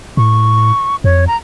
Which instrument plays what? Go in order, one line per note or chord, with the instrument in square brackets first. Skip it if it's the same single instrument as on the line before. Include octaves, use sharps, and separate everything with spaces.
[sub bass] A2 [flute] C#6
[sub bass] F2 [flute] C#5
[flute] A#5